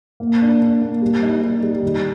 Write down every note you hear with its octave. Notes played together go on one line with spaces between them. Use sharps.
A#3
D4
D4
A#3
G3
D#4
G3
G3
D#3